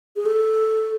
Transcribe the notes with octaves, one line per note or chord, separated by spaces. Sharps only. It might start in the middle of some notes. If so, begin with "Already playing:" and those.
G#4
A4